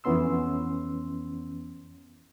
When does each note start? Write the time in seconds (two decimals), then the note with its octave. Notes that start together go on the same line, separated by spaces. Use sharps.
0.04 F2 E3 B3 C#4 C6 E6